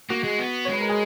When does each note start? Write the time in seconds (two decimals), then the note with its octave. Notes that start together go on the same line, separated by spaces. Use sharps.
0.10 A#3 F#4
0.24 G#3
0.39 B3
0.65 C#5
0.69 G#3 B4
0.81 A#4
0.89 G#4